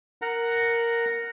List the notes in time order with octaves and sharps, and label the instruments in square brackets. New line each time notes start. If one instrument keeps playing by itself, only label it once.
[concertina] A#4 F#5 A#5